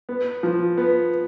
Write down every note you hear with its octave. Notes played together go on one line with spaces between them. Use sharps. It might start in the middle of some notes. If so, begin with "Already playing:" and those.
B3
F3
B3